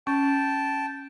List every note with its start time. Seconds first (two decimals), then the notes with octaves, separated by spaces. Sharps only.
0.07 C#4 G5 A5